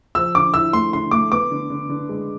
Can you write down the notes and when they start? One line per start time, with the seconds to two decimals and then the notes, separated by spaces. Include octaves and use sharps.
0.15 F3 E6
0.34 D3 D6
0.54 E4 E6
0.73 A3 C6
0.93 D3 C6
1.11 A3 D6
1.32 B3 D6
1.51 D3
1.70 D3
1.89 D3
2.09 G#3